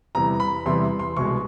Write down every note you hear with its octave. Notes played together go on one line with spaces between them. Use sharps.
E2 C3 E3 G3 A#5
B5
E2 C3 E3 G3 C6
C6
C2 B2 G#3 C#6